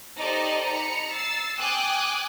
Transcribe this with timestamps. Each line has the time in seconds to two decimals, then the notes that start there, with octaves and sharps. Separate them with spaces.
0.20 D#4 G4 A4 C5 D5 D#5
0.66 A#5 B5 C#7
1.10 E6 A6 C7
1.58 G5 G#5 D6 D#6 F#6